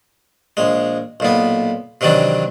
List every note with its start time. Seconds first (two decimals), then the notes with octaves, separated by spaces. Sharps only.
0.57 A#1 G#3
1.20 B1 A#2 B3
2.01 C3 D#3 E3 F#3 D4